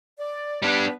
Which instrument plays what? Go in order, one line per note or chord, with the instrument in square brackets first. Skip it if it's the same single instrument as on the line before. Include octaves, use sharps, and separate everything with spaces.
[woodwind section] D5
[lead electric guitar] G3 D4 [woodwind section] B3 B4